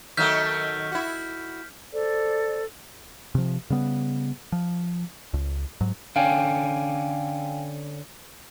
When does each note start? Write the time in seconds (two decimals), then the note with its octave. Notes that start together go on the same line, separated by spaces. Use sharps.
0.17 D#3 F#3 A3 F6 G6 B6
0.92 E4 F#4
1.92 A4 C5 D5
3.35 C3 F3
3.70 C#3 G3 B3
4.52 F3
5.34 C#2
5.81 G#2 F#3
6.16 D3 C#4 D4 F5 G5 G#5